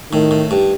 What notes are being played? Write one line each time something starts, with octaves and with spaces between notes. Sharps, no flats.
A2 D#3
A2
G2